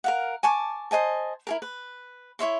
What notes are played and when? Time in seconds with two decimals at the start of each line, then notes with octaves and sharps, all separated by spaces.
0.04 A#4 F5 F#5
0.43 G#5 A5 C#6 D6
0.91 C5 D#5 G#5 A5
1.47 E4 G#4 A#4
1.62 B4
2.39 E4 C#5 E5 C6